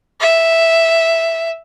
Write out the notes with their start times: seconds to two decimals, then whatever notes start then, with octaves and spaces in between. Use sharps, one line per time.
0.20 E5